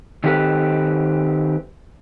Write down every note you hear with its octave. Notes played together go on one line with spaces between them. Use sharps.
D#3 F#3 C4 G4 A4 B4